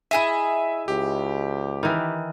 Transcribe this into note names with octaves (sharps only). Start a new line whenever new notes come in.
E4 G#4 D#5 E5 D#7
C#2 G4
D#3 E3